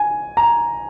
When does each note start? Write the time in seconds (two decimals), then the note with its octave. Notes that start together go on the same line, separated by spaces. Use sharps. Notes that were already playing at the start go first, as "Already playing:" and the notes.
Already playing: G#5
0.37 A#5